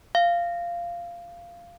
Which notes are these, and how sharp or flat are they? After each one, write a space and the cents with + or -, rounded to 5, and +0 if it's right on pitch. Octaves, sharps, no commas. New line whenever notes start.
F5 -15